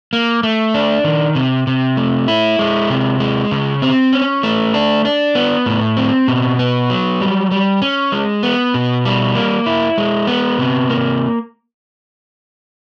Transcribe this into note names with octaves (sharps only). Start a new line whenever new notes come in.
A#3
A3
D4
D#3
C3
C3
A3
E4
G#3
C3
G#3
C#3
C4
C#4
A3
D4
D4
B3
A2
C4
B2
B3
F#3
G3
G3
C#4
G#3
B3
B2
G3
A#3
E4
G#3
B3
C3
A#3